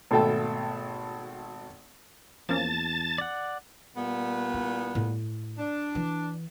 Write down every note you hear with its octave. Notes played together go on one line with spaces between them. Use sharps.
G#1 B2 A3 A4 G5 A5
E2 F3 A#3 C#4 A5 A6
D5 F#5
A#2 G3 B3
E4
A2
D4
E3